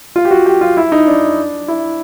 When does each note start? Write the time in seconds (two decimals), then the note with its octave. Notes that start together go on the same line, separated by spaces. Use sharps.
0.16 F4
0.25 G4
0.31 F#4
0.46 G4
0.61 F4
0.77 E4
0.92 D#4
1.07 D4
1.68 E4